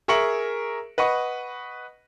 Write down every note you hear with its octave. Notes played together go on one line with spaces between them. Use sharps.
G#4 A#4 E5 C#6 C#7 F#7
B4 D#5 F#5 C#6